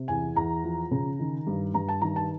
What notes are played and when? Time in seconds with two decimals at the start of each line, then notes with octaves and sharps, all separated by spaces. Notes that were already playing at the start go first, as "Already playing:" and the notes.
Already playing: C3
0.08 E2 G#5
0.35 E2 A#5
0.63 F3
0.91 C#3
1.19 D#3
1.47 G2
1.74 G2 A#5
1.88 A5
2.01 D#3 A#5
2.16 A5